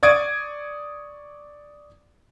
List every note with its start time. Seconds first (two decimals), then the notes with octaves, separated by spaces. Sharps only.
0.03 D5 C#6 D#6 G#6 A6 D7